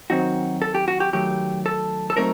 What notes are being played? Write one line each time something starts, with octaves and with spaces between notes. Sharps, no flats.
D#3 F#3 C4 D#4 F#4
A4
G4
F#4
G4
D#3 F#3 A3 G4
A4
A4
F#3 A3 C4 D#4 A#4